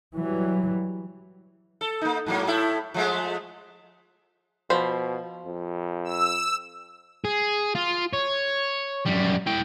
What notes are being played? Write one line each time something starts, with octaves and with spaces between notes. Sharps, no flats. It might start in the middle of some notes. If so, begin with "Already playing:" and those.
E3 F#3 G3
A4
A#3 D#4
G#2 F#3 A#3
A2 E4 A4
F3 G#3 A3
B2 F3 C5 B5
F2
E6
G#4
F4
C#5
F#2 G3
E4 G5